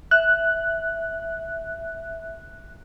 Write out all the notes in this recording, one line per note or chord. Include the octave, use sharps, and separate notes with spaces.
E5 F#6